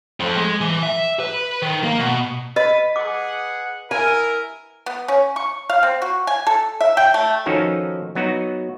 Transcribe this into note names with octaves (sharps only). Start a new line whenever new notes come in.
F2
G#3
E3
E5
B4
D#3
A#3
B2
B4 D#5
G#4 F#5 D6
E4 A#4 G#5
B3
C#4
C#6
F5
C4
F#4
G#5
A4
E5
G5
A3
D#3 F3 C#4 D#4 F#4 A4
F#3 B3 D#4 F#4